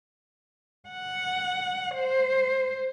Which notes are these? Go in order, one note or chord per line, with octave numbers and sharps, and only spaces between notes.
F#5
C5